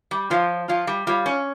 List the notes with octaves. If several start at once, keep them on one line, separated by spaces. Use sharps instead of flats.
G3
F3 F4 C#5 F5
F3 F4 C#5 F5
G3
G3 F4 C#5 F5
C#4